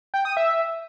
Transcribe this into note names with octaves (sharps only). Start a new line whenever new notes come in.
G5
D#6
E5